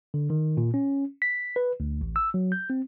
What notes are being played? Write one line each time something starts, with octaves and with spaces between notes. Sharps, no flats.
D3
D#3
A#2
C#4
B6
B4
D2
A1
E6
F#3
G6
C4